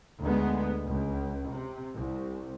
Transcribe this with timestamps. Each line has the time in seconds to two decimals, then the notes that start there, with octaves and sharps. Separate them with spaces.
0.23 D2 G#3 B3
0.89 C#2
1.52 C3
1.95 C2